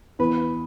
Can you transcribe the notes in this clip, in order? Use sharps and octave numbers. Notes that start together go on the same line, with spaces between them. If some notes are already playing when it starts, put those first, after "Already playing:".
E2 B4